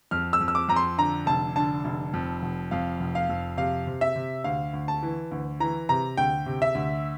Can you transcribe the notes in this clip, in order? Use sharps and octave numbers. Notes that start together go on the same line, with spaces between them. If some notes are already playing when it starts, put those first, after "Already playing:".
F2 F6
E6
F2
E6
D6
F2 A#5
C6
D3 A#5
F1 A5
D3 A5
F1
F2
F1
F2 F5
F1
F5
F2
C3 F5
C3
E5
C3
D2 F5
D2
A5
E3
D2
E3 A#5
C3 A#5
D2 G5
C3
E5
D2